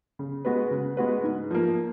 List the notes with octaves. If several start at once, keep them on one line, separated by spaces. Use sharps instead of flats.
C#3
G#3 B3 F#4 B4
C#3
G#3 B3 F#4 B4
G#2
F3 A#3